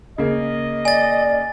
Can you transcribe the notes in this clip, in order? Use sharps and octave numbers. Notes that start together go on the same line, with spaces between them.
C#3 A#3 D#5
D5 G#5 A6